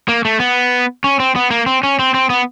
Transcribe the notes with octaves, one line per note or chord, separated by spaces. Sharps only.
A#3
A3
B3
C#4
C4
B3
A#3
C4
C#4
C4
C4
B3